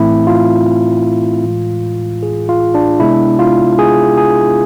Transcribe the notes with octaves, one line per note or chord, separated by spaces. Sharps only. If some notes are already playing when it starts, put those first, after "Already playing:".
Already playing: A2 E3 A3 C4 E4
F4
A2 E3 G#3
G#4
F4
D4
C3 G#3 B3 D4 E4
F4
G#4
G#4